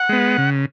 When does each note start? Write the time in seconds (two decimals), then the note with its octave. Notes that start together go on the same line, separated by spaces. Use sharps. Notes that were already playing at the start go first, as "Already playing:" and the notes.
Already playing: F#5
0.09 G#3 B3
0.38 C#3